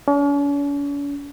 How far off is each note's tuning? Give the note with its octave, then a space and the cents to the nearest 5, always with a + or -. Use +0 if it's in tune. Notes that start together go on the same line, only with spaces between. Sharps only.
C#4 +45